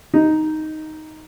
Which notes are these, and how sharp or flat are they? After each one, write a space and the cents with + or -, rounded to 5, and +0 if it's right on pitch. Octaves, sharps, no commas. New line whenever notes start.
D#4 +0